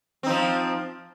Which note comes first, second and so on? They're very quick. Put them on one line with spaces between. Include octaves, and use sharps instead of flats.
C4 D#4 F3